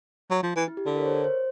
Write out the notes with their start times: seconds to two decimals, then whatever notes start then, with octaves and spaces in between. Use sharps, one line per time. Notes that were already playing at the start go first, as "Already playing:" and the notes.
0.31 F#3
0.43 F3
0.56 E3
0.68 E4
0.77 G4
0.86 D3 A4
0.96 A#4
1.01 C#5
1.06 C5
1.24 C5